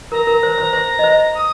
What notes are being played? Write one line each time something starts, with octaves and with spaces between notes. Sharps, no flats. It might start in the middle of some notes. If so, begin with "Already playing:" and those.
A#4 A#5
A#4
C5
C5
C5
D#5
C5
D#6